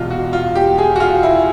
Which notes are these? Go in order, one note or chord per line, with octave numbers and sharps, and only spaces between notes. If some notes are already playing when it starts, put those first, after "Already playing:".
Already playing: E1 E2 B2 F4
F#4
F4
G4
G#4
F#4
F4
E4